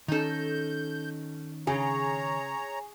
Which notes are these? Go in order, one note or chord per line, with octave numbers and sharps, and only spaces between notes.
D#3 C#4 D#4 A4 G6
C#3 G#4 C#5 A#5